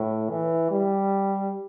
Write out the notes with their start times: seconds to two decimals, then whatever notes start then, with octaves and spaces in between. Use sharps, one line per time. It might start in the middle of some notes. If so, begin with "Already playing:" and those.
Already playing: A2
0.30 E3
0.71 G3